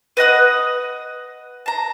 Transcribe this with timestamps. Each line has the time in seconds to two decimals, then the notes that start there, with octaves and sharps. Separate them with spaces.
0.17 B4 D#5 F#5 D#6
1.66 A5 A#5